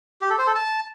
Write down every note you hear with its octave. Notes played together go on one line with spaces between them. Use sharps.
G4
A4
C5
A4
A5